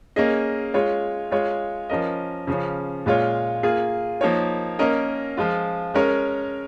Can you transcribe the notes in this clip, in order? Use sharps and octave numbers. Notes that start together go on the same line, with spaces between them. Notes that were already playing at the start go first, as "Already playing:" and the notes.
A#3 C#4 G#4 D#5
G#3 F4 C#5
G#3 F4 C#5
F3 C#4 A#4 D#5
C#3 F3 C#4
A#2 G#3 F4 C#5
A#3 F4 G#4
F3 A#3 D#4 A#4 C#5
A#3 C#4 A#4 D#5
F3 G#3 F4
G#3 C#4 A#4 C#5